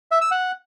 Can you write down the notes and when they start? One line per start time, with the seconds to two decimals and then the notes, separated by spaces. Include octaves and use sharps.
0.11 E5
0.21 E6
0.31 F#5